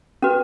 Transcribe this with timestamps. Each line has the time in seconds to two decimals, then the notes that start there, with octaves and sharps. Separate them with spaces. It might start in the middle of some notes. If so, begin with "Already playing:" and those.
0.22 C#4 F#4 B4